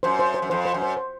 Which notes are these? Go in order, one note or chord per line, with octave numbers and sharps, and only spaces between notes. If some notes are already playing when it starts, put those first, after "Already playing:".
F#2 C5
C5
C5
F#2
F2 C5
C5
F#2
C5
C5